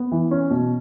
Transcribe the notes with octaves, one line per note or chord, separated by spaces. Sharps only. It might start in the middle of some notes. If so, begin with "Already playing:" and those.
Already playing: B3
E3
C#4
B2